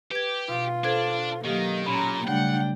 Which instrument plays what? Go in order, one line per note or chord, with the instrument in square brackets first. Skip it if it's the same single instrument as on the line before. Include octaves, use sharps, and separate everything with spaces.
[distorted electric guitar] G4 [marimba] B4 G#6
[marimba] B2 [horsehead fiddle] F4
[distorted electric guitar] D4 [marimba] A4 C5 G#6
[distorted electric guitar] D#3 [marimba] F#3 G4 [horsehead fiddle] A#3 D#5
[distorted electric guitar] A#2 [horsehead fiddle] C#4 A#5 [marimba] B5
[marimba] C#3 G3 A3 [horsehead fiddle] D4 G5 [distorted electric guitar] F#5